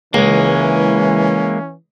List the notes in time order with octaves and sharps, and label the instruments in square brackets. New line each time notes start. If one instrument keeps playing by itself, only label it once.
[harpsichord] C#2 [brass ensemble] E3 [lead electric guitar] G#3 A#3 [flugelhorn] C#4